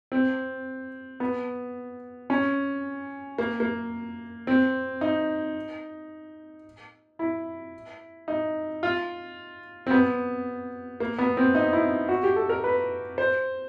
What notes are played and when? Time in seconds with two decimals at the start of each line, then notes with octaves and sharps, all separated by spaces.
0.12 C4
1.20 B3
2.30 C#4
3.38 A#3
3.60 A#3
4.47 C4
5.01 D#4
7.19 E4
8.28 D#4
8.83 F4
9.87 C4
9.91 B3
11.00 A#3
11.19 B3
11.37 C4
11.55 D#4
11.73 E4
12.09 F#4
12.23 G4
12.36 A4
12.49 A#4
12.64 B4
13.18 C5